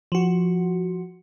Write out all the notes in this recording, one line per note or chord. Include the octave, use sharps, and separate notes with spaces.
F3 F#4